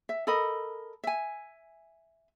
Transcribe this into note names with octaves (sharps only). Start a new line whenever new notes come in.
E5
A4 A#4 D#5 B5
E5 G#5